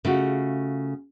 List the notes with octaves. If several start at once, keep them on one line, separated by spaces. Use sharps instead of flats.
C#3 A3 F4 F#4